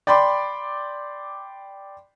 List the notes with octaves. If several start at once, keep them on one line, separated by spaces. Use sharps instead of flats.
D5 G5 B5 C6 D6